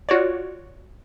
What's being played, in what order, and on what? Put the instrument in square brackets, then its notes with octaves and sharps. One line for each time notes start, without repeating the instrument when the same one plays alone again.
[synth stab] F4 F#4 C#5 D5